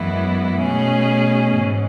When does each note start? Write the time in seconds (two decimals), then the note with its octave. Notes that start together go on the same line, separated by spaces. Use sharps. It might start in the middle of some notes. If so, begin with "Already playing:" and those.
Already playing: F#2 E3 G#3 B3 E4
0.61 B2 A3 C#4 G#4
1.57 G#2 E3